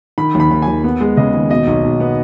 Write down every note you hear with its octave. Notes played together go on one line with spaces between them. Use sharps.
D#3 B5
D#2
B5
D#2
D#2 G#5
B3
G#3
C#3 D#5
D#2
B2 D#5
B1
B1
B3